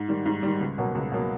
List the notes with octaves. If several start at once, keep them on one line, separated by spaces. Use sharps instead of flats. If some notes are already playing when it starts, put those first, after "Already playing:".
Already playing: G#2
D#3 G3
G#2
D#3 G3
C#2
B2 F#3 A#3
C#2
B2 F#3 A#3